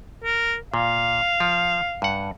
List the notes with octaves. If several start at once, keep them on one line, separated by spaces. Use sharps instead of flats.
A#4
A#2 F5
F3
G2 F#5